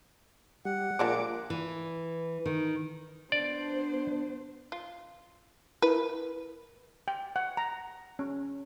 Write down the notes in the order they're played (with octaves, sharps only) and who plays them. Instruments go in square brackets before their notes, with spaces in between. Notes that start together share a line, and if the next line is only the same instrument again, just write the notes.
[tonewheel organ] G3 [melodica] F#5
[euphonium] A#2 [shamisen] F3 G#3 D4 [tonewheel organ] D6
[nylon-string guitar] E3
D#3
[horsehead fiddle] B3 C5 [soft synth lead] D4 [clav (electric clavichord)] D5
[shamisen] F4
[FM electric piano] E4 A#4 [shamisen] B4
[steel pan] G5
F#5
A#5
C#4